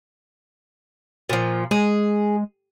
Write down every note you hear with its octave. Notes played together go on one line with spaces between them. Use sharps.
A#2 F3
G#3 G#4